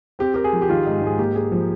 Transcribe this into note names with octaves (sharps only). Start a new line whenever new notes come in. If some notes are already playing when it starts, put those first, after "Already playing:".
C4 G4
G4 A#4
G#4
F3
G4
D#3 F4
G#2
G#2 G#4
A#3 G4
G#4
F3